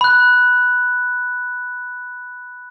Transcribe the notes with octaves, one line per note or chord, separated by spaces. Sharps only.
B5 F#6